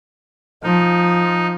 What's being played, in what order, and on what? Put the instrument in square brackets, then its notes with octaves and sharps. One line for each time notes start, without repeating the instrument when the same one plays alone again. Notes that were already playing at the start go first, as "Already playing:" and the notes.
[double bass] F3 [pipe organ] D#4